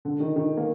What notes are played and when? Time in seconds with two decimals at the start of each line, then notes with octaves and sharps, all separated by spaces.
0.05 D3
0.20 D#3
0.36 D#3
0.57 A#3